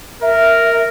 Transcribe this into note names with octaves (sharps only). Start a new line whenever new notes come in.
A#4 E5